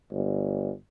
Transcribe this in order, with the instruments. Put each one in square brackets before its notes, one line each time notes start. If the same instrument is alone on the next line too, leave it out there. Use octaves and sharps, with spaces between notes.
[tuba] G1